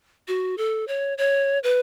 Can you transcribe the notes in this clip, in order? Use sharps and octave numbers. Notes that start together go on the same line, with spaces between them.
F#4
A4
C#5
C#5
B4